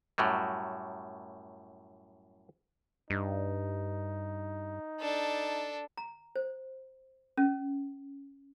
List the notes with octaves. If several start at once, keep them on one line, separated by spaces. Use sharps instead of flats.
F#2 A2 F#3 G3
G2 D#4
D4 A4
A#5
C5
C#4